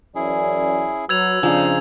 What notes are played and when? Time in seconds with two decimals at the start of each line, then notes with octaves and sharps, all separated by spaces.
0.15 F#2 E3 C#4 E4 G#4 D5
1.09 F#3 B4 E6 G#6 F7
1.43 F2 C#3 F3 D4 D#4 C5